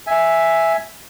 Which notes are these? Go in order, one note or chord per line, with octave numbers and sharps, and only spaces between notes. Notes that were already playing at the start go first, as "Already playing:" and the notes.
E5 G#5